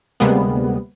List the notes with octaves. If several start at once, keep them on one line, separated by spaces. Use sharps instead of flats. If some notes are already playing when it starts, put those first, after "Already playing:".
D2 C3 G3 G#3 A#3 B3